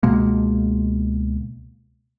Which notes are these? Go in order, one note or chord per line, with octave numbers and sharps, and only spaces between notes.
C#2 B2 G#3 A#3